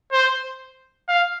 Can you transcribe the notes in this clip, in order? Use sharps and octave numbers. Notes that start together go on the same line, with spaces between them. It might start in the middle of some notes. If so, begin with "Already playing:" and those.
C5
F5